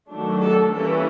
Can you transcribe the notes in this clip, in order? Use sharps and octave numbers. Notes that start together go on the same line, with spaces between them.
D#3 F#3 A3 D4
A4
E3 G3 A#3 C#4 A4